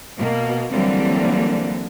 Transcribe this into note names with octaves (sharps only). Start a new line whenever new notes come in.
B2 A#3
D3 E3 F#3 G3 A#3 C4